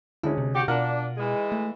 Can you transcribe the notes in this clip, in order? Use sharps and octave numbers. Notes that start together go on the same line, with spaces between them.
D2 G#3 C#4 E4
C3
F#4 G4
B2 D4 F4 A#4 F#5
E3 G#3
A3